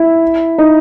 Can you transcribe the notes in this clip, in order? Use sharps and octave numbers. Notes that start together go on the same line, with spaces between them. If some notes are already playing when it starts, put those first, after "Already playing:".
Already playing: E4
D#4